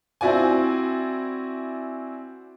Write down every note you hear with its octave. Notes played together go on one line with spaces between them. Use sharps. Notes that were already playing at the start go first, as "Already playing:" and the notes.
C4 E4 F#4 D5 G#5